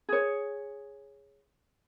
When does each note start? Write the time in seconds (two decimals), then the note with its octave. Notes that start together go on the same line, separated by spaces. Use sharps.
0.09 G#4 C#5